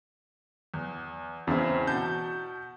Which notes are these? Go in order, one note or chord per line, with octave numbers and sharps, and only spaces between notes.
E2
E2 C#3 C4 E4
B2 F#4 A5 G6